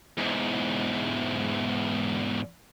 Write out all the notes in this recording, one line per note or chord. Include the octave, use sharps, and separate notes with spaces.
E2 G#2